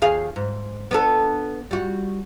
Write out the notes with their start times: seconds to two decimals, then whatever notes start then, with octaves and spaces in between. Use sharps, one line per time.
0.02 D#2 G#4 F5
0.36 G#2
0.91 B3 D4 A4
1.71 G3 F#4